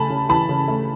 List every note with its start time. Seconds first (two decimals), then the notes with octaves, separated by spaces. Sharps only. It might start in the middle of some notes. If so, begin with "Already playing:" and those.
Already playing: C#3 A3 G#5 A5 B5
0.10 C#3
0.29 E3 A5 B5
0.49 C#3
0.68 A3